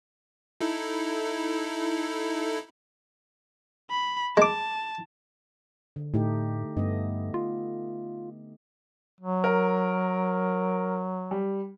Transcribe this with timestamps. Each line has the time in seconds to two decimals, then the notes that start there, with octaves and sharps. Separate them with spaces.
0.61 D#4 E4 A4
3.90 B5
4.37 G#3 A5 D6
5.96 D3
6.14 A2 A3 D#4 G4
6.77 G2 A3 B3 D#5
7.34 F4
9.21 F#3
9.44 A#4
11.31 G3